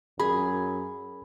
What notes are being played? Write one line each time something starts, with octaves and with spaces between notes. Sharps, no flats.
F#2 G#4 B5